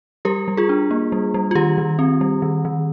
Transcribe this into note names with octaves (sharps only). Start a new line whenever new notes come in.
G3 G4 A#4
G3
F4 G#4
D4
A#3
G3
G3
F4
D#3 G4
D#3
C4
G3
D#3
D#3